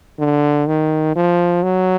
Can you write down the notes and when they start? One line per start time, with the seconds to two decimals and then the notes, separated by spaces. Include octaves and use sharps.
0.19 D3
0.67 D#3
1.15 F3
1.63 F#3